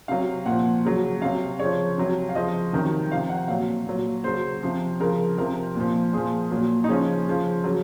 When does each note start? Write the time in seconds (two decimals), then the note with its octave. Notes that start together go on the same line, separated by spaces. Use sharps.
0.08 C3 F#3 F5
0.46 A#2 F#5
0.51 F3
0.85 C#3 F#3
1.22 C3 F#3 F5
1.59 C#3 F3 C#5
1.98 C3 F#3
2.29 F5
2.35 C#3 F3 D#5
2.73 C3 D#3 F#3
3.11 F3 F5
3.15 C3
3.29 F#5
3.48 A#2 F#3 F5
3.86 A#2 F#3
4.24 C#3 F#3 C5
4.63 C3 F3
5.00 C#3 F3 A#4
5.38 C3 F3 A#4
5.75 A#2 F3
6.13 A#2 F3 G#4
6.51 A#2 F#3
6.84 D#4
6.89 C#3 F3 C#4
7.27 C#3 F3
7.64 C#3 F#3